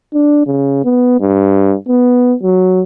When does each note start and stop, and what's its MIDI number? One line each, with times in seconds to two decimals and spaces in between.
0.14 0.46 62
0.47 0.82 49
0.84 1.16 59
1.20 1.75 43
1.88 2.34 59
2.43 2.82 54